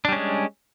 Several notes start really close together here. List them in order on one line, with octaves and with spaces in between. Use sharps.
D4 G3 C#4 G#3